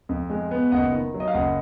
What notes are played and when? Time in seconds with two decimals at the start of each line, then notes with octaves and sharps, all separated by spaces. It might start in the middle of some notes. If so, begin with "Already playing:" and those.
0.09 F2
0.30 G#3
0.51 B3
0.72 F#1 D#5 F#5
0.92 D#3
1.14 F#3
1.20 D#5
1.28 F5
1.34 F#1 D#5 F#5